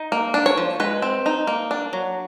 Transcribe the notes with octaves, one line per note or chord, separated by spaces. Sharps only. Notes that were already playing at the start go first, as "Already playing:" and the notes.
Already playing: D#4
A#3
D4
C#5
F3
G#3 B4
C4
D#4
A#3
D4
F#3